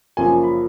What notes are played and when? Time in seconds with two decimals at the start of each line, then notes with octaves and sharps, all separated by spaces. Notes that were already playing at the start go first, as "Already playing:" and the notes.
0.17 F#1 F#2 F3 A#3 G#5
0.43 B5